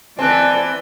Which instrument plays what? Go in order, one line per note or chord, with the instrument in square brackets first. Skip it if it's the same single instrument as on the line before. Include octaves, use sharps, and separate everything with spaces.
[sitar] E3 C4 [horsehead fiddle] D5 [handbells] G#5 A5 F#6